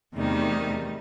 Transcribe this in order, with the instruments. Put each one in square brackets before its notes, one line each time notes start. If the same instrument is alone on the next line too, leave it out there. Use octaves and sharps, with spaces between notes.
[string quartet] E2 C3 D#3 G3 D#4 [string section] A3